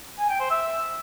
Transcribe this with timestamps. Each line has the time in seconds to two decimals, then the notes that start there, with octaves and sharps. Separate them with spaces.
0.19 G#5
0.29 G5
0.40 C5
0.50 E5